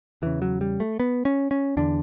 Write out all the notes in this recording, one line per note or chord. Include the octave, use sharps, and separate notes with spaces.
E2 C#3 E3
F#3
G3
A3
B3
C#4
C#4
E2 D3 D4